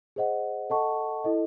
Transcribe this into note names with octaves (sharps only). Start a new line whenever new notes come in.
G#4 C5 D#5 F#5
A4 D#5 F#5 A5 C#6
E4 A4 D#5